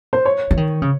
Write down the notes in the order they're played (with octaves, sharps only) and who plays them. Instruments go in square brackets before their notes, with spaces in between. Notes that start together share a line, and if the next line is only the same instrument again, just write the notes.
[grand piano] C5
C#5
[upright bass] E3
D#3
C#3